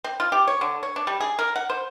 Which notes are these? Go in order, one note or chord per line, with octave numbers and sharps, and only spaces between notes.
C4
F4
G4
C#5
D3
C#5
D4
G3
G#4
A#4
F#5
C5